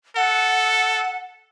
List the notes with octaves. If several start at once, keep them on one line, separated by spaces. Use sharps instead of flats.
A4 F#5